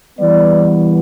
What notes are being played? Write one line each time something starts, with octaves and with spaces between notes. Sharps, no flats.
E3 G3 B3 D5